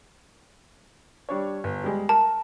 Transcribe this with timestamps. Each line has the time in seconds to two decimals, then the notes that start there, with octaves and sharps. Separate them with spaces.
1.29 G3 D4 C#5
1.64 G1
1.84 G3 G#3
2.09 A#4 A5